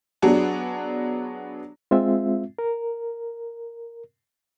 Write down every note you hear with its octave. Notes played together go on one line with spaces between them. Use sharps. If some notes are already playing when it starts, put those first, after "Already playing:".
F#3 B3 D4 F#4 G#4
G#3 C4 F4 E5
A#4